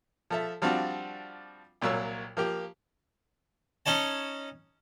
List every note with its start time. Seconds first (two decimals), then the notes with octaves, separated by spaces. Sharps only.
0.30 F3 A4 E5
0.62 F3 G3 C4 D4 F4 F#4
1.82 C2 A#2 F#3 F4 E6
2.37 F3 A#3 G4
3.86 C#4 D#4 C#5 A5